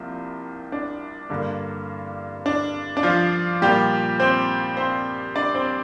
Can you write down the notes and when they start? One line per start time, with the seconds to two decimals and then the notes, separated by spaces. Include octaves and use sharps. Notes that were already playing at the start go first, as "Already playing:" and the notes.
Already playing: C2 C3 F3 A#3
0.72 D4
1.30 G2 D3 A#3
2.46 D4
2.97 D4
3.03 F3 F4
3.61 A#2 F3 G3 A#3 G4
4.20 C4 C5
4.77 C4 C5
5.36 D4 D5
5.55 C4 C5